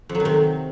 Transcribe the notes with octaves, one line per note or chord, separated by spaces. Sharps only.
F2
F#3
D#3
C3